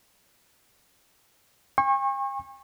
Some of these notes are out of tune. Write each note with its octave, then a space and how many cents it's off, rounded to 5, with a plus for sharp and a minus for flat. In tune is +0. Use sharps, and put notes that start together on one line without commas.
G5 +45 C#6 -30